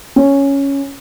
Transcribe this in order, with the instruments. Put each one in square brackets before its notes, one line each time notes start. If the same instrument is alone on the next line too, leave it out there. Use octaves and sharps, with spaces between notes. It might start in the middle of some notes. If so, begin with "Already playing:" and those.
[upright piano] C#4